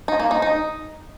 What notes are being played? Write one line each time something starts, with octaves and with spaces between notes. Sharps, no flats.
D#4
A#3
D#4
D#4